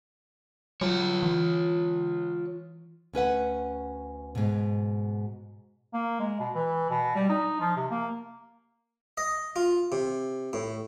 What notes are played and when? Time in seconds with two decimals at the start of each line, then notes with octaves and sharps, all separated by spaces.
0.81 F#3 F4 C#5
1.23 E3
3.13 D2 C#4 B4 F#5
4.35 G#2 B2
5.93 A#3
6.20 G#3
6.40 B2
6.55 E3
6.90 B2
7.16 G3
7.30 D#4
7.60 F3
7.76 C3
7.91 A#3
9.17 D#5
9.56 F4
9.92 C3
10.53 A2